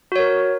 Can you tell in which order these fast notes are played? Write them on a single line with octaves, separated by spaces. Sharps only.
F#4 C#5 A#4